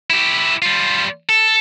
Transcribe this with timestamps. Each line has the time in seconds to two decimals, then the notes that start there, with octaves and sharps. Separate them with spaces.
0.10 E4 G4
0.62 G3 F4
1.29 A4